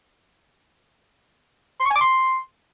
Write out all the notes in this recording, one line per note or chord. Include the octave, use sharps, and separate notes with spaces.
C6
C#6
G#5
D6
C6